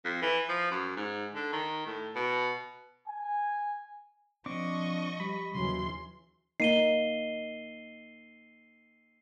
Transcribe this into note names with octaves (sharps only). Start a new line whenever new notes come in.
F2
E3
F3
F#2
G#2
D3
D#3
A2
B2
G#5
F3 C4 D4 D#5 C#6 D6
G3 B5
D#2 C#3 E3 F#3 C6
A#3 D#4 C7 D#7 G7